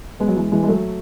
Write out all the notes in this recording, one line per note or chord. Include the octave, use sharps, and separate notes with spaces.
G#3 B3
F#3
E3 G#3
E3 G#3
G#3
F#3 A3